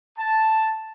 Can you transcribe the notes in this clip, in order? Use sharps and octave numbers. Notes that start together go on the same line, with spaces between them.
A5